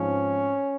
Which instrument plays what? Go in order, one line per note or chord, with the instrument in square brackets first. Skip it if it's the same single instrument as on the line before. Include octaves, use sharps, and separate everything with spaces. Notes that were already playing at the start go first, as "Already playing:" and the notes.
Already playing: [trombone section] G#2 F3 C4 C#4